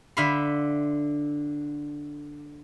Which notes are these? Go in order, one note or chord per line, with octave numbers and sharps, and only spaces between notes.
D3 E5 F5 B5 C6